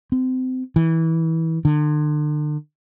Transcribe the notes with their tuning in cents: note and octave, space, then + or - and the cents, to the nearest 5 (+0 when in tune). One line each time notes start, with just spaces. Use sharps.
C4 -30
E3 -20
D3 +40